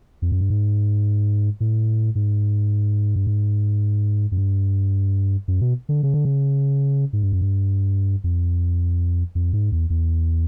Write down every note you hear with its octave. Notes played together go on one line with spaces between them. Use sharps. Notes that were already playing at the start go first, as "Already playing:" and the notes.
F2
F#2
G2
G#2
A2
G#2
G2
G#2
F#2
G2
F#2
B2
D3
C#3
D3
C#3
G#2
G2
F#2
G2
F2
F2
G#2
E2
E2